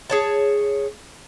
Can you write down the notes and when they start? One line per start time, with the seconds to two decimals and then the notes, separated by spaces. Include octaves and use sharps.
0.10 G#4 C#5 A5